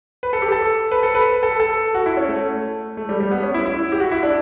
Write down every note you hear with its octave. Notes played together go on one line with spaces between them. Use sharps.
B4
A4
G4
A4
B4
A4
B4
A4
A4
F#4
E4
C#4
A3
A3
G3
G3
B3
C#4
E4
E4
G4
F#4
E4
D4